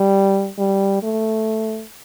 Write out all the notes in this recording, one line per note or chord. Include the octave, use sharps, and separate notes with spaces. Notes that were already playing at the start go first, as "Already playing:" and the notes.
Already playing: G3
G3
A3